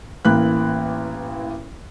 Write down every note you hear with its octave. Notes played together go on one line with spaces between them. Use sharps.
A1 E3 A#3 B5 F#6